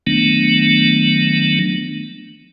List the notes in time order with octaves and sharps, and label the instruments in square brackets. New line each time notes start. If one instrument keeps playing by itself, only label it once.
[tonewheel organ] D#3 F#3 A3 B3 D4